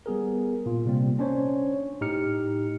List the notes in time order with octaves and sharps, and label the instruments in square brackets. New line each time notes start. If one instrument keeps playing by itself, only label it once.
[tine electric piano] G3 B3 G#4 A#4
A#2 F4
C3 G3 A#3 C4
C#4 D4 C5 C#5
A2 D#4 G4 F6 C#7